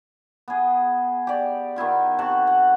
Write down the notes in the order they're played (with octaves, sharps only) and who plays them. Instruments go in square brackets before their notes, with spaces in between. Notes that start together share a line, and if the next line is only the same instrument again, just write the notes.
[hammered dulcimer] B3 G#4
G4 D5
D#3 B3 E4 F4
C3 F#5 A5 C#6
F#5